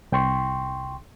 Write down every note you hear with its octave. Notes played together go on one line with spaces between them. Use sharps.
C2 G5 C6 C#6